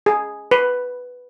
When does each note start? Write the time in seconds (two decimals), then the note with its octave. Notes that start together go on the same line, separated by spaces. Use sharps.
0.06 G#4
0.51 B4